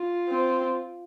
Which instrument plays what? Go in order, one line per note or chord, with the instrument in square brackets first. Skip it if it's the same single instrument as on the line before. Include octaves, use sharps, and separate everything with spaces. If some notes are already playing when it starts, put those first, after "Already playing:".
Already playing: [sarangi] F4
[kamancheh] C4